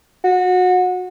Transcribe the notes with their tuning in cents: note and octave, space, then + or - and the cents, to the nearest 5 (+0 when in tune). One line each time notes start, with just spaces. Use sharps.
F#4 -25